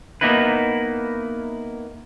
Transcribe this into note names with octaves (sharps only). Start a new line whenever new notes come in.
A#3 B3 D#4 E4 B4